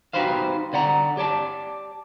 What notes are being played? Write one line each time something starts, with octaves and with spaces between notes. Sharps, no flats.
D#4 F#4 G4 B4 C5 F5
D3 D5 F#5 A#5
G4 C#5 D5 A5